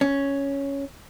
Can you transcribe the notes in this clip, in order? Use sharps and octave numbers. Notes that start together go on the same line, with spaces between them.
C#4